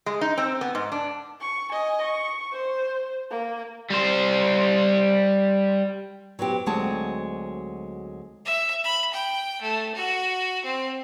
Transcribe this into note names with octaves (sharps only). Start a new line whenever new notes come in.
G#3
D#4
C4
B3
G#2
D4
C#6
D#5 G#5
C#6
C5
A#3
G3 C5
F#3 B3 C4 G4
D2 F#3 G#3 C4 D#4 A5
E5
B5
G5
A3
F#4
C4